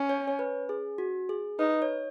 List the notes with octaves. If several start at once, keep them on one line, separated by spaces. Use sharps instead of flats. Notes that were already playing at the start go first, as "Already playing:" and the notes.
Already playing: C#4
C#5
C#5
B4
G#4
F#4
G#4
D#4 B4
C#5